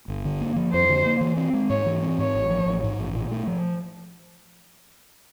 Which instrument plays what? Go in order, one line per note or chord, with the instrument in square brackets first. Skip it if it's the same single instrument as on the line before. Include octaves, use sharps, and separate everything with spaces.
[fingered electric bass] G1
D3
A#3
F3
[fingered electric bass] F2 [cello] C5
[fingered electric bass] D3
A#3
E3
C4
G#3
[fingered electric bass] G#2 [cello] C#5
[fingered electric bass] E3
C4
[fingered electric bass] G#2 [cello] C#5
[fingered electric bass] A1
F3
A1
G#2
A1
A#2
A3
F3